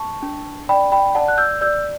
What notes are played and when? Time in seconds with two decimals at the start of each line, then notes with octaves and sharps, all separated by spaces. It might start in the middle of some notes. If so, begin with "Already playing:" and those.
Already playing: A5 C#6
0.23 D4
0.69 D5 G5 B5
0.92 G5 B5
1.15 D5 F#5 A5
1.28 F#6
1.38 E6 G6
1.61 D5 E6 G6